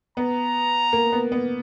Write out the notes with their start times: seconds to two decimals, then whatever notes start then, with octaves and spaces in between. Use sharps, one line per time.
0.17 B3 A#5
0.93 A#3
1.12 B3
1.32 B3